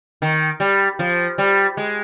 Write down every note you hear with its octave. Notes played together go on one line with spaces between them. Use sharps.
D#3
G3
F3
G3
G#3